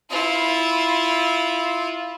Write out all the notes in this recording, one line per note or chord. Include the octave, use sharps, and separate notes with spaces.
E4 F4